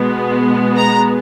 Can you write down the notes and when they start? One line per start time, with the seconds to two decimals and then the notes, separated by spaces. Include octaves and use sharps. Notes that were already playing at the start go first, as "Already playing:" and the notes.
Already playing: B2 G#3 B3
0.78 A#5